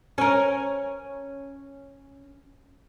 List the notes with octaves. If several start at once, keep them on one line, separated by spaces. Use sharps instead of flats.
C#4 A#4